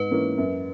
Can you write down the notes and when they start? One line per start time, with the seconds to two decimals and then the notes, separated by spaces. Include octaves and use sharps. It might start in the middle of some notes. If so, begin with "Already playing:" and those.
Already playing: G#2 B4
0.11 E3 A#3 C#4
0.37 F#2